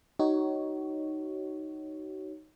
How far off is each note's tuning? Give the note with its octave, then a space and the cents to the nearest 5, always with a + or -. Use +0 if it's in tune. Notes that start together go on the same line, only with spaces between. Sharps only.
D#4 +0 F#4 +40 C#5 +0